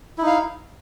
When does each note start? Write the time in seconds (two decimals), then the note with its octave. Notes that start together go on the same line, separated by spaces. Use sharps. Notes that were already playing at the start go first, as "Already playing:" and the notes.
0.18 E4
0.22 D#4
0.27 F5